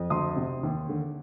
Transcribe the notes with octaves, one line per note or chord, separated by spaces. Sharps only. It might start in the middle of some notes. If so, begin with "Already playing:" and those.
Already playing: F2
D2 C6 D#6
C3
D#2
D3